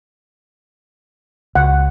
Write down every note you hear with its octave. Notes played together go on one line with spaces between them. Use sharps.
C#2 F#5